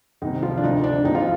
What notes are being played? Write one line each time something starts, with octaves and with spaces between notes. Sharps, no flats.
C2 C3 D#3 D#4
F3 F4
D4
D2 C3 F3 D#4
D4
C2 C3 F3 D#4
F3 F4